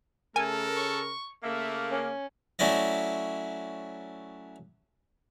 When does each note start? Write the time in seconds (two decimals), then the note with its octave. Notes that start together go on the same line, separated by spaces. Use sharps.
0.36 C#3 A3 A4 A#4 G#5
0.77 C#6
1.43 C#3 A3 A#3 E5
1.91 C#4
2.59 F#3 A3 C#4 E4 D5 D#5